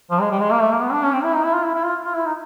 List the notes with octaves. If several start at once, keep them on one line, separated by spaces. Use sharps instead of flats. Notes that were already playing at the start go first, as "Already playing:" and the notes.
F3
G#3
G3
G#3
A#3
A3
A#3
B3
D4
C#4
C4
E4
D#4
E4
F4
E4
E4
F4
F4
E4
D#4